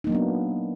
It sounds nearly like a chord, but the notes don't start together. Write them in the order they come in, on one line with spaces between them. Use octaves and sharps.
D#4 A#3 F#3 D4 B3